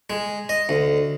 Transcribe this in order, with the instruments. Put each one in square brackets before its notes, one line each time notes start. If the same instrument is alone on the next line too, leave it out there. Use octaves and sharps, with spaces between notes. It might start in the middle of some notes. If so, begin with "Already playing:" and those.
[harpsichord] G#3
D#5
D2